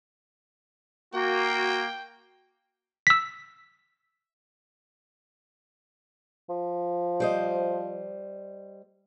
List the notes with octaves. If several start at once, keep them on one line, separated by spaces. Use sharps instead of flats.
A#3 F#4 G5
E6 B6
F3
G3 C5 D#5